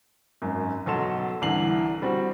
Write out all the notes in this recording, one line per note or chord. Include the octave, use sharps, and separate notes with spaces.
G#1 F#2
B1 F#3 A4 C6 E7
C2 D3 E3 C7 F#7
G3 C4 F#4